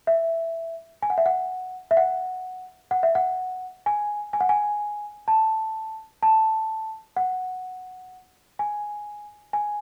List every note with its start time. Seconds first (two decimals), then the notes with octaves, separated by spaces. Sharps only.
0.07 E5
1.02 G#5
1.10 F#5
1.18 E5
1.26 F#5
1.91 E5
1.97 F#5
2.91 F#5
3.03 E5
3.15 F#5
3.86 G#5
4.33 G#5
4.41 F#5
4.49 G#5
5.28 A5
6.23 A5
7.16 F#5
8.59 G#5
9.53 G#5